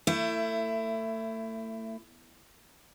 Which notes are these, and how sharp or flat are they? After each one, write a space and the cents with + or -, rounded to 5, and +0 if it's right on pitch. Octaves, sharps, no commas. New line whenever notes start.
A3 +35 E4 +20